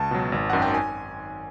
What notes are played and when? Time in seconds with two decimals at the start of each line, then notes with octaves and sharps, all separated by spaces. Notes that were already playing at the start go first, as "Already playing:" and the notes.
Already playing: C#2 A5
0.11 B2 F#3
0.32 G#1
0.50 F#2 D#3 F#5
0.62 G5
0.74 G#5